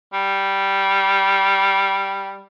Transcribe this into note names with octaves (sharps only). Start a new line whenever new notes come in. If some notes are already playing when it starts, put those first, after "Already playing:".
G3